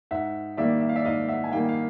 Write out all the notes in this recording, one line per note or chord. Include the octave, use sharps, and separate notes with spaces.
G#2 E5 F#5
D#3 G3 A#3 D5 E5
E5
F5
D5 E5
G#2 D#5 F5
E5 F#5
G#5
D#3 G3 A#3 F5 G5
F5